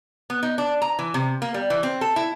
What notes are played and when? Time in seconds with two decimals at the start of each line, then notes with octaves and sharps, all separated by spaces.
0.30 B3
0.43 D#4
0.58 D4
0.82 A#5
0.99 E3
1.14 C3
1.42 A#3
1.54 G3
1.70 E3
1.83 C4
2.01 A4
2.16 E4